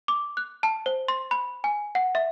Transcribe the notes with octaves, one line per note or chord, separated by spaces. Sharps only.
D6
F#6
A5
C5
C6
B5
G#5
F#5
E5